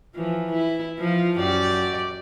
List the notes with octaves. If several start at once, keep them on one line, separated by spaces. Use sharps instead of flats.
E3 F3
E4
F3 F4
F#2 G4 D5